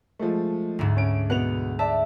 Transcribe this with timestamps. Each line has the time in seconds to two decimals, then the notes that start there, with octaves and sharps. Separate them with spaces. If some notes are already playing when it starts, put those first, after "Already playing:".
0.20 F3 G#3 A3
0.79 D2 G#2
0.97 C#4 D7
1.30 B2 B3 F#5 F7
1.79 D5 E5 A5